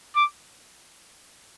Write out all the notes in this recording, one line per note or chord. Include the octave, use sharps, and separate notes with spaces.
D6